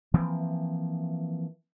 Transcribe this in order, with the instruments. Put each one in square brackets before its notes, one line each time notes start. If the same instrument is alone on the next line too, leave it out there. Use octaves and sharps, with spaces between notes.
[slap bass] E3 F3 A#3 C4